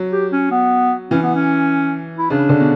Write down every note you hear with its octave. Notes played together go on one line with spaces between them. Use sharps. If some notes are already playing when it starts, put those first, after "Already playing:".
Already playing: F#3
G4
C#4
B3
E3 C#4
B3
C#4
E4
C#3 D4
D3
B2